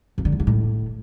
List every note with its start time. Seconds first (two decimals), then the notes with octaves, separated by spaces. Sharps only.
0.18 F2
0.25 D3
0.32 E2
0.40 C#3
0.47 A2